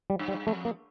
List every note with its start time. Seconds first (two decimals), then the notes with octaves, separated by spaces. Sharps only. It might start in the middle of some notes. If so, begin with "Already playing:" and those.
0.10 G3
0.19 G2
0.28 G3
0.47 F2 A3
0.65 A#3